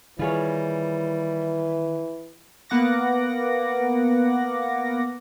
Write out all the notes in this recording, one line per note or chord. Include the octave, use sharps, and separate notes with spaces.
D#3 E3 G3 F4 G#4 C#5
A#3 B3 F#5 D6 A#6